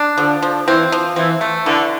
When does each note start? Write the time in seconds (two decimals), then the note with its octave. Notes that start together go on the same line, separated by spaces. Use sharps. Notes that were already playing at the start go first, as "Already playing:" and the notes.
Already playing: D4
0.18 D3 F3
0.42 F3
0.67 E3 C4
0.92 F3
1.16 E3 C4
1.41 A3
1.66 D3 E3